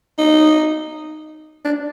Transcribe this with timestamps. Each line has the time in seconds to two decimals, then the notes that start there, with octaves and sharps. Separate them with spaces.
0.19 D#4
1.65 D4